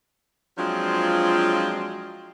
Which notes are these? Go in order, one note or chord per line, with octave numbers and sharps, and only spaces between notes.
F3 F#3 G#3 C4 D4 F4